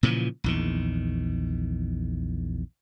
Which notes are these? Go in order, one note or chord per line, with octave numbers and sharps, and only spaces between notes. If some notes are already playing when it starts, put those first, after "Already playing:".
A#2 C#3 E3 F3
A#1 E2 D#3